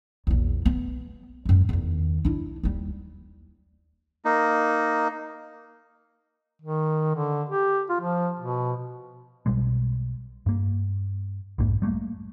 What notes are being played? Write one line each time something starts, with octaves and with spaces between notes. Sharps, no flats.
A#1 E2
B3
F#2 G#3
E2 D#3
D4 E4
D#2 G3
A#3 D#4
D#3
D3
G4
F4
F3
B2
B1 B2 G3 G#3
G2 A#3
B1 F2 G#2 A#3
G3 A3 A#3